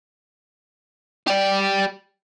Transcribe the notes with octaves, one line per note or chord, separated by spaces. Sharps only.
G4 D5